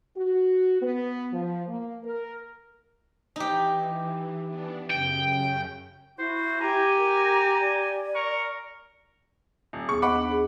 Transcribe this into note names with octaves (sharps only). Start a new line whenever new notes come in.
F#4
B3
F3
A#3
A#4
E3 D#4 G4
E3 B3 D4
F#2 C#3 G5
E4 F#4 C5
G4 G#5 A#5
A#4
D5
A#4 C#6
D#1
D#2 B3 G#4 C#6
C5 D#5 F#5 B5 D6
D4
G#4